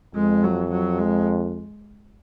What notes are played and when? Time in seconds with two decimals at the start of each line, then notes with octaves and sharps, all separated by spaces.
0.15 F2 G#3
0.44 F#3
0.71 F#3
0.99 G#3